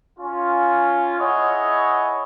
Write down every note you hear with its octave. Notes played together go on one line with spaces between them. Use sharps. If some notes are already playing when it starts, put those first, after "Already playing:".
C#4 F4
E4 G#4 C#5 D#5 F#5